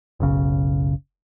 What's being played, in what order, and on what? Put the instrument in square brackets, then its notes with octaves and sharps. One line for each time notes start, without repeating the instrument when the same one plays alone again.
[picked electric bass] F#1 B1 C#3